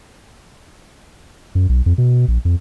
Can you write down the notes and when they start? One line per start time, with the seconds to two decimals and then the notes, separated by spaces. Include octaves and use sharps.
1.55 F#2
1.69 B1
1.86 F2
1.98 B2
2.28 A#1
2.45 F2